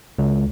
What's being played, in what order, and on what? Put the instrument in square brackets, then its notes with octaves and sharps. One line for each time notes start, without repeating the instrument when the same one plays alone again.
[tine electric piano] C#2